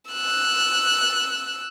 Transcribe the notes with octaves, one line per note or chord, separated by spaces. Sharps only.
E6 F#6